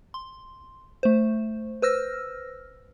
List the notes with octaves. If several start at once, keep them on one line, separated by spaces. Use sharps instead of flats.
C6
A3 C5
B4 C5 E6 F6 A#6